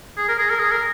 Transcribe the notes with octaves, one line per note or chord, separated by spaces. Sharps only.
G#4
A#4
G#4
A#4
G#4
A#4